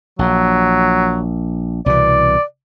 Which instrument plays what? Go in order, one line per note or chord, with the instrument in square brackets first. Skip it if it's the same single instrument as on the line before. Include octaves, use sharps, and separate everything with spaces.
[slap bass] A#1 [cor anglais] F#3
[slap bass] C2 B2 E3 [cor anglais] D5